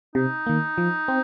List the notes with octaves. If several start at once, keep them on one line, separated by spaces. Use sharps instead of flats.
C3 D#4
D#3 A#3
F3
C4